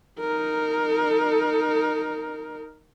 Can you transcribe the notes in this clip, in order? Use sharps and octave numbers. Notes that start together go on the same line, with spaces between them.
D#4 A#4